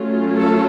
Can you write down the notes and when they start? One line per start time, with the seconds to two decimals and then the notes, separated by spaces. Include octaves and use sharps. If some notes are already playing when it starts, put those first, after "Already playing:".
Already playing: F#3 A3 C#4 F4
0.38 A4